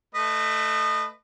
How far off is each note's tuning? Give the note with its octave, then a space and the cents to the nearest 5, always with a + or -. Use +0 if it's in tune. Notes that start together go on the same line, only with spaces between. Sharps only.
A3 +0 B4 +10 D#5 -25